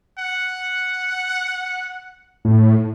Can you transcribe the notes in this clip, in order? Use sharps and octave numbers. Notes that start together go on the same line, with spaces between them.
F#5
A2